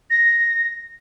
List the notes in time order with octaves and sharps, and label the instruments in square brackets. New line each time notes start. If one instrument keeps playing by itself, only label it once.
[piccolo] A#6